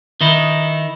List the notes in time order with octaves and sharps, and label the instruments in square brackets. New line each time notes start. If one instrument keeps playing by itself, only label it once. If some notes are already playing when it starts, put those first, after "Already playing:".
[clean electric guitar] D#3 D#4 E4